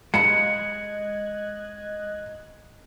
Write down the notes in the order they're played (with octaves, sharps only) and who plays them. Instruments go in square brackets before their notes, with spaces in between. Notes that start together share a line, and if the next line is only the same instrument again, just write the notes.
[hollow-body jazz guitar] G#3 A5 B5 [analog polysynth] D#5 F#6 G#6 [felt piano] C#7